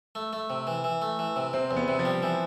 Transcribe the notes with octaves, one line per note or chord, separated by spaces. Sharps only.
A3
A3
C3
E3
E3
A3
E3
C3
C3 C4
E2
B3
C3
F3
G3
E3